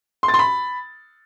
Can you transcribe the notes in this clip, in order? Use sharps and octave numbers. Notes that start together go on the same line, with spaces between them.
C6
A6
C6
B5